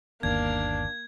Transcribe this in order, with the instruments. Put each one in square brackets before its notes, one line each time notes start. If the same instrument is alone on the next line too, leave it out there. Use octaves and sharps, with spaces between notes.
[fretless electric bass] G1 D#2 [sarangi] A#3 [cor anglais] D4 [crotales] G#6